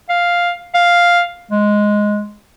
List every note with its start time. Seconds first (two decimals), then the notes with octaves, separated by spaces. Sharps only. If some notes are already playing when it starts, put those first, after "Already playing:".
0.09 F5
0.74 F5
1.51 G#3